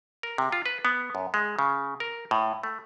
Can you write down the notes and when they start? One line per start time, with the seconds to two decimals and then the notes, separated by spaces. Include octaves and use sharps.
0.23 A#4
0.38 C3
0.52 F4
0.66 B4
0.85 B3
1.15 F#2
1.34 G#3
1.59 C#3
2.00 A#4
2.31 A2
2.63 A3